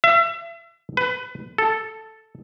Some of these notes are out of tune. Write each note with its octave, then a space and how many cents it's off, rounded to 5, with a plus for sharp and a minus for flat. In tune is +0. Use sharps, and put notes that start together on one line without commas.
E5 +35
B4 +25
A4 +0